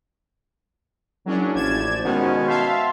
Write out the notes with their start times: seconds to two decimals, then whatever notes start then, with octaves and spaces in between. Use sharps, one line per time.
1.26 F#1 F#3 C#4 D4
1.55 A1 F3 G4 D5 G#6 E7
2.04 G#2 B2 D#3 G#3 C#4
2.49 E5 F5 A5 C6